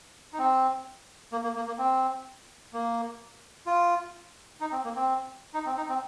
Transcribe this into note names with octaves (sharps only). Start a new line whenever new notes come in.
D#4
C4
A#3
A#3
A#3
A#3
C4
A#3
F4
D#4
C4
A#3
C4
D#4
C4
D#4
C4